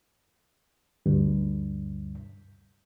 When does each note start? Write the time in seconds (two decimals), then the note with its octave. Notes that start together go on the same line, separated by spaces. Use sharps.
1.06 D2 G2